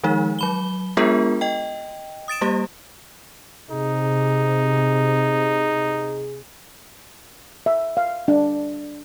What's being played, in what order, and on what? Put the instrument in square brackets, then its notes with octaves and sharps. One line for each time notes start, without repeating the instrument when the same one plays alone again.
[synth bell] D#3 F3 G#3 D#4
F#3 B5 G7
G#3 B3 D4 F4 G#4 A#4
D#5 G5
D#6 A6 D7 E7
G3 A#3 G4
[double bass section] C3 [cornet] D#4 [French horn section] G#4
[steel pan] E5
F5
D4